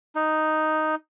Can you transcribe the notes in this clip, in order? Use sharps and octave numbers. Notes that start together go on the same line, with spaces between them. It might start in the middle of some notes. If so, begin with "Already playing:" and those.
D#4